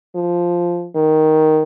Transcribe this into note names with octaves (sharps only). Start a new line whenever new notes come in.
F3
D#3